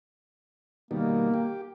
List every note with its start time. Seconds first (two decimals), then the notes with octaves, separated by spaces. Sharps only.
0.91 B2 D#3 G3 A#3
1.34 G4